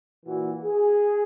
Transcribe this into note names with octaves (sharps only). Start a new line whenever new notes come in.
A#2 E3 F#4
G#4